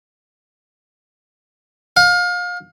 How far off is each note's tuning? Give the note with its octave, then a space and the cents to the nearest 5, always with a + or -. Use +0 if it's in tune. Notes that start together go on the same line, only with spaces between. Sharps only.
F5 +30